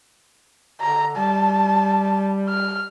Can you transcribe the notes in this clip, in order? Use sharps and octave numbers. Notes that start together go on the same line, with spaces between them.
D3 A#5
G3 A5
F6